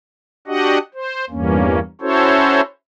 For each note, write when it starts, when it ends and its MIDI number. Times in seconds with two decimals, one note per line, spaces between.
0.47 0.78 62
0.47 0.78 66
0.47 0.78 67
0.47 0.78 75
0.47 0.78 78
0.94 1.25 72
1.30 1.79 40
1.30 1.79 43
1.30 1.79 58
1.30 1.79 61
2.01 2.61 61
2.01 2.61 64
2.01 2.61 66
2.01 2.61 69
2.01 2.61 72
2.01 2.61 73